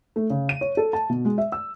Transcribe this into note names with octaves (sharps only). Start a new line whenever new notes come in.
A3
C#3
D#7
C#5
A4
A5
B2
G#3
E5
E6